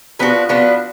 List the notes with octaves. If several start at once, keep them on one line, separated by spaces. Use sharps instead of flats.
F3 B3 D4 F#4
F3 B3 D4 F#4